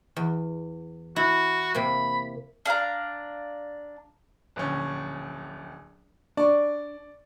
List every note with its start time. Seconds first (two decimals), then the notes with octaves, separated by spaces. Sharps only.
0.16 E2
1.16 E4 F#4
1.75 C3 A#3 B5
2.66 D4 F5 G#5 A#5
4.56 D1 A#1 C#4
6.37 D4 D5 C#6